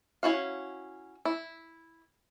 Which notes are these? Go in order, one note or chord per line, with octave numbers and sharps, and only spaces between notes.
C#4 E4 F#4 F5
E4